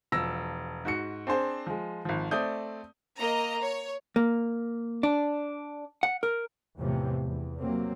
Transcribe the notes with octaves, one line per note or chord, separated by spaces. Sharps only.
E1 F3 E6 A#6
G#2 F#4 C#7
C4 D4 G#4 C5
F3 G#3
G#1 F3
A3 C4 D5 D#6 G6
A#3 D#5 A#5
C#5
A#3
D4
F#5
A#4
E2 A2 C3 E3 F3
E2
C3 F#3 A#3 C4